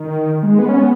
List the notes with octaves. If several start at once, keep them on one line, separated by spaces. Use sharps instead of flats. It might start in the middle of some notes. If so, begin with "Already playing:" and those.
Already playing: D#3
G#3
B3
C#4
B3